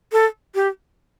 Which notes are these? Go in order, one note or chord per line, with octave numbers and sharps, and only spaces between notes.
A4
G4